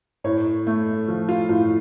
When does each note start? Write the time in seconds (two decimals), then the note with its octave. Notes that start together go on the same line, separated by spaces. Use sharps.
0.24 A2 C#5
0.67 A3
1.08 F3
1.29 F4
1.49 A2 F4